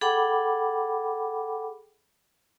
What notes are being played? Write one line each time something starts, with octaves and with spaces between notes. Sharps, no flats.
G#4 A4 F#5 G5 B5 D6